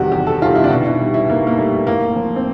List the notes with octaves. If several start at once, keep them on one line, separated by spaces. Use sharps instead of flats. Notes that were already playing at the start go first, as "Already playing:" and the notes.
Already playing: E2 C3 D#3 G3 F#4 G4
E2 G4
A4
C3 D#3 G3 F4
E4
D4
B2 D#4
E4
G3
E4
B2 A#3
A#3
G3 A3
A2 A#3
F3
C4